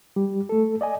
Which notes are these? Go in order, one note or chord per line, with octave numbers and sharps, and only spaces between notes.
G3 G4
A3 A4
D5 D#5 G#5